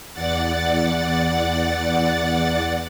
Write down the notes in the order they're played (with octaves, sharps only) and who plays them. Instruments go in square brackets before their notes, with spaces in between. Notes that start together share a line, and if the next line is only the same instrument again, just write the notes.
[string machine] E2 D5 F#5 A6